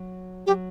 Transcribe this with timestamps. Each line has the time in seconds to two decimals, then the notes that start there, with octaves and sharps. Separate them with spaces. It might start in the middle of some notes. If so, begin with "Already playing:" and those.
Already playing: F#3
0.47 F#3 G4